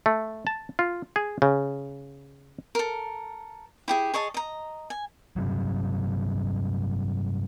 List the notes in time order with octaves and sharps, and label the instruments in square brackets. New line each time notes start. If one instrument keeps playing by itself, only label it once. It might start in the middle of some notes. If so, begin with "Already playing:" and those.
[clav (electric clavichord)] A3
A5
F4
G#4
C#3
[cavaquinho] A4 A#4
E4 G4 G#4
G#4 C#5 D#5 A5
D#5 A#5
G#5
[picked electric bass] G2 C3 F#3